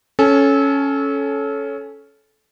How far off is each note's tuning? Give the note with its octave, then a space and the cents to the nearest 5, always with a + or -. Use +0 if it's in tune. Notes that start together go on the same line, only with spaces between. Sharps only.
C#4 +0 A4 -20 G#5 +0